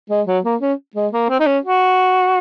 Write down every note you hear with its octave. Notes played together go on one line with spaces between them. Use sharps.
G#3
F#3
A#3
C#4
G#3
A#3
C4
D#4
C#4
F#4